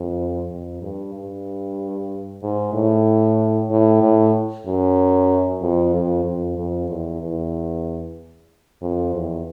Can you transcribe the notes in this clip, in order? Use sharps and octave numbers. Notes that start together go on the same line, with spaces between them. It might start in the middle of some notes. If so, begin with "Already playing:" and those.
Already playing: F2
F2
G2
G2
G#2
A2
A2
A2
F#2
F2
F2
F2
F2
E2
E2
F2
E2